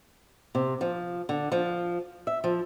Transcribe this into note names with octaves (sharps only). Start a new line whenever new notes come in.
C3
F3
D3
F3
E5
F3